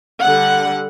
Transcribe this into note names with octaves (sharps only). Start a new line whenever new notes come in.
D3 G3 F#5